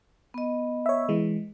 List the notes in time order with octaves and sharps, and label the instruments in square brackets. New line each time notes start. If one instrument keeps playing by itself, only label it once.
[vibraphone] B3 D#5
[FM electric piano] C#5 E5
E3 G#3